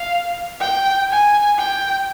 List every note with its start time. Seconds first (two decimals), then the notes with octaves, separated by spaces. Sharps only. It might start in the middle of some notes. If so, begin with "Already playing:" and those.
Already playing: F5
0.61 G5
1.10 G#5
1.58 G5